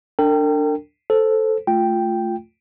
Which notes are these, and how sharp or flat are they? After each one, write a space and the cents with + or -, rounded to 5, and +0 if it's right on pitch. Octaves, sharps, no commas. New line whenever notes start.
D4 +0 A#4 -45 G5 +0
A4 +0 C5 +0
A3 +0 F4 +0 G5 +0